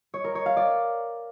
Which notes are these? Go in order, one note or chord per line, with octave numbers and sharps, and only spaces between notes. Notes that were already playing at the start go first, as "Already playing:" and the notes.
C#5
A#4
C#5
F5
D5